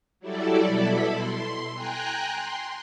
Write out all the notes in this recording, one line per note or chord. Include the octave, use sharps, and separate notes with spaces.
F#3 G3 E4 A4 D5
B2 E4 A4 B5
C6
G5 G#5 A#5 F#6
C6